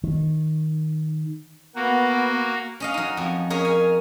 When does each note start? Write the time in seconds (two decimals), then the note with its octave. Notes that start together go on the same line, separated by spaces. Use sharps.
0.04 D#3
1.75 A#3 B3 F#4
2.80 C#4 D#5 F5
2.94 F#3 D#4
3.17 F2
3.50 C#4 G#4 A#4 C#5
3.65 G#5